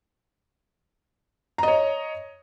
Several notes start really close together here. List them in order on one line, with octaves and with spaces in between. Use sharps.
A#5 D#5 C#5